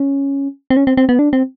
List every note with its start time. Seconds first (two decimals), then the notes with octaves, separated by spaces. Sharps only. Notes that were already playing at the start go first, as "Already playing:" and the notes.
Already playing: C#4
0.70 C4
0.77 C#4
0.87 C4
0.97 C4
1.09 B3
1.19 D4
1.33 C4